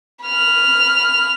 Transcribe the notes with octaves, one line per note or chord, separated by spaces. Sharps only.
B5 F6